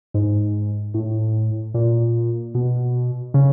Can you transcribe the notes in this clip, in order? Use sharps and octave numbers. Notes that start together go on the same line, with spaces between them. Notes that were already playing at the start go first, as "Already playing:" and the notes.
G#2
A2
A#2
B2
C#3